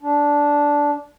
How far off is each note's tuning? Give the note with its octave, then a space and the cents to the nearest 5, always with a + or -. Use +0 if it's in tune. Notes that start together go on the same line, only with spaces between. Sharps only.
D4 -10